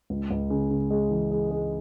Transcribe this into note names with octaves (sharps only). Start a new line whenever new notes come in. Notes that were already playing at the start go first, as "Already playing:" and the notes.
C#2
C#2
C#3
C#3
G#3
E3
G#3
G#3